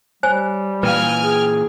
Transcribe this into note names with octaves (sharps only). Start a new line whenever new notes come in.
G3 C5 C#5 G#5
A#2 E3 B4 F5 G5 G#5 F6
G#4